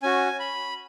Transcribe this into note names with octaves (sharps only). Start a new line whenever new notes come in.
C#4 F#4 G#5
B5